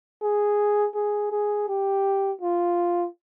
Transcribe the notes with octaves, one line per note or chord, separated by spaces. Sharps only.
G#4
G#4
G#4
G4
F4